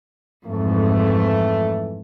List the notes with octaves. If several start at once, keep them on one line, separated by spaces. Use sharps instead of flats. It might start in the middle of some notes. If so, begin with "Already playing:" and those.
F2 G#2 E3 A3